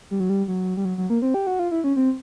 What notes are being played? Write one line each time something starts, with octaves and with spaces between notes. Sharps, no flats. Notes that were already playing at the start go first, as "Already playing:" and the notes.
G3
F#3
G3
F#3
G3
F#3
F#3
A#3
C4
G4
F#4
F4
E4
C#4
C4